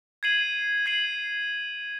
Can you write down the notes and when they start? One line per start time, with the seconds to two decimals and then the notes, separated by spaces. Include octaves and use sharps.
0.23 G#6 C7 D#7 F#7
0.86 G#6 C7 D#7 F#7